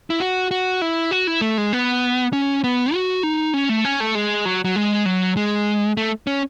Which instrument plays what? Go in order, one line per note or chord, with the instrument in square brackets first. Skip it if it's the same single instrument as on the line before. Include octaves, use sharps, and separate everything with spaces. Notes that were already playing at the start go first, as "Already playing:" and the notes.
[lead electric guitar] E4
F#4
F#4
E4
F#4
E4
A3
G#3
B3
C#4
B3
F#4
D#4
C#4
A3
C#4
A3
G#3
F#3
F#3
G#3
F#3
G#3
A3
C#4